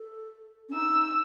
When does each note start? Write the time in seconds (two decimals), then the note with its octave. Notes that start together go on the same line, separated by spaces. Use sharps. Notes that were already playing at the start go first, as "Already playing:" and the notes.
Already playing: A4
0.69 C#4
0.74 D#4 E6